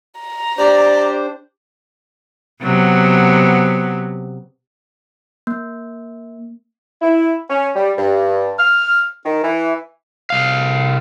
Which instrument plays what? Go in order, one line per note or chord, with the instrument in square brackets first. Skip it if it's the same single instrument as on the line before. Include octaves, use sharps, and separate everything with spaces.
[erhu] A#5
[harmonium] D4 C5 [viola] G4 [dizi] D5
[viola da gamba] C3 F#3 B3
[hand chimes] A#3
[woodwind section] E4
C#4
G3
G2
F6
D#3
E3
[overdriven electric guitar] C2 F5